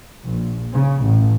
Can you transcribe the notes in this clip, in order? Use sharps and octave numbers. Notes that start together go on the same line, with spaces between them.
A#1
C#3
A1